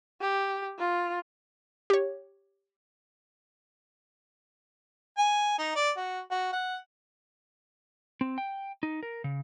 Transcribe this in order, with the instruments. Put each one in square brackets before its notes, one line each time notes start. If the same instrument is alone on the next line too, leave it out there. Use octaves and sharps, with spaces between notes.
[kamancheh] G4
F4
[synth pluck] G4 C#5
[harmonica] G#5
D#4
D5
F#4
F#4
F#5
[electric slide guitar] C4
G5
D#4
A#4
C#3